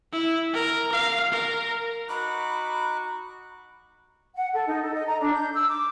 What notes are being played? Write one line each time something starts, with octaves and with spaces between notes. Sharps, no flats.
E4
A#4
F5
A#4
D#4 F#4 B5 D6 F#6
F#5
A4
D#4
A4
D#5
A#5
D4
G6
E6
D6